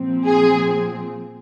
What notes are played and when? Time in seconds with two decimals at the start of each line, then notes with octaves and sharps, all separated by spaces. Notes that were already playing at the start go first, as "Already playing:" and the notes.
Already playing: A#2 F3 C4
0.25 G#4